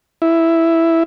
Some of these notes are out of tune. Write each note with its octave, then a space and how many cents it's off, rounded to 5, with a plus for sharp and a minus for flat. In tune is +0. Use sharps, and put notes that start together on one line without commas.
E4 +5